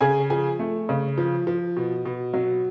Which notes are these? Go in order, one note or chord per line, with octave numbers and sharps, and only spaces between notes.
C#3 G#4 G#5
F3 G#4 G#5
A3
C#3
F3
F3
B2
B2
F#3